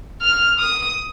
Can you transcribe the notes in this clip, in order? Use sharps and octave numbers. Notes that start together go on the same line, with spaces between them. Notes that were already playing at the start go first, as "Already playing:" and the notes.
F6
D#6